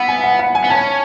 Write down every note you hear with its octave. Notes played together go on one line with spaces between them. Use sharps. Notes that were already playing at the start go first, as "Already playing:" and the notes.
Already playing: B3 E5 F#5
G#5
F#5
F#5
G#5
B3
C#4 A5